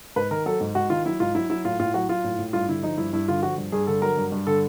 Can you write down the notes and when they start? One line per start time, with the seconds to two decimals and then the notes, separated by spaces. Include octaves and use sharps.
0.16 G#2 B4
0.31 D#3 A#4
0.46 F#3 A4
0.61 G#2
0.75 G#2 F#4
0.90 D#3 F4
1.05 F#3 E4
1.20 G#2 F4
1.35 F#3 E4
1.50 F#3 E4
1.65 A2 F4
1.79 A2 F4
1.94 F#3 F#4
2.09 F#3 F4
2.24 A2
2.38 A2
2.53 G2 F4
2.68 D3 E4
2.83 F3 D#4
2.98 G2 E4
3.13 G2 E4
3.28 D3 F4
3.43 F3 F#4
3.58 G2
3.72 G2 G#4
3.87 D3 A4
4.02 F#3 A#4
4.17 G2
4.32 G2
4.47 D3 A4